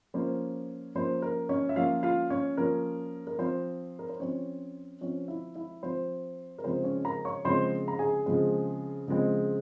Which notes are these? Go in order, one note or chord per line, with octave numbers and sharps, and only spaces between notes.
F3 A#3 C#4 C5
F3 A#3 C#4 C5
A#4
C#4 C#5
E5
F3 A#3 C#4 F4 F5
F4 F5
C#4 C#5
F3 A#3 C#4 A#4
A#4
F3 C4 C5
A#4
C5
F3 C4 C#4 C#5
F3 C4 C#4 C#5
E4 E5
E4 E5
F3 C4 C5
A#4
C#3 F3 G#3 C4 C5
C#4 C#5
A#4 A#5
C#5 C#6
C#3 F3 G#3 C4 C5 C6
A#5
G#4 G#5
C#3 F3 G#3 C4
C#3 F3 G#3 C4